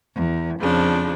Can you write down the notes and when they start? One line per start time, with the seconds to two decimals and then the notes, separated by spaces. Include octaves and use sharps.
0.15 E2
0.59 F2 C#3 F3 D4